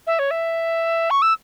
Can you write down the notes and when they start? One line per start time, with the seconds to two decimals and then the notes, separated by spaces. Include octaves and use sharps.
0.07 E5
0.19 C#5
0.31 E5
1.10 C#6
1.22 E6